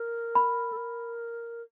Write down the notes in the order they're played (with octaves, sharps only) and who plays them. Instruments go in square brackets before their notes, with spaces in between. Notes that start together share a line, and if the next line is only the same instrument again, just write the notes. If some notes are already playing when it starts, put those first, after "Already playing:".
Already playing: [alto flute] A#4
[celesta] B5
[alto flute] A4
A#4